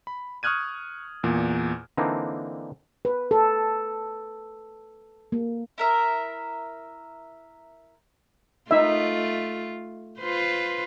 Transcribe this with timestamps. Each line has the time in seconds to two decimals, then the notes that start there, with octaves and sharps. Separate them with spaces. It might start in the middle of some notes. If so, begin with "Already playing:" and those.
0.07 B5
0.43 C#6 D#6 F6 F#6 G#6 D#7
1.23 E2 A#2
1.97 D3 E3 A#3 C4 D4 D#4
3.05 B4
3.31 A4
5.32 A#3
5.78 E4 A#4 E5
8.71 A3 D#4 F4 E5
10.19 F4 B4 C5